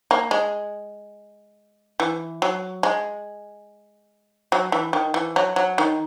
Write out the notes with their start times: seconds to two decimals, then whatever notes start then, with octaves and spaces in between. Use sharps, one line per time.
0.11 A#3
0.31 G#3
2.00 E3
2.42 F#3
2.83 G#3
4.52 F#3
4.72 E3
4.93 D#3
5.14 E3
5.36 F#3
5.56 F#3
5.78 D#3